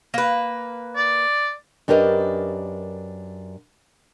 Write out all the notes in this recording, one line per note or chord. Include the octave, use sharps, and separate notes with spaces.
A#3 B4
D5
F#2 D4 G4 A#4 B4 D#5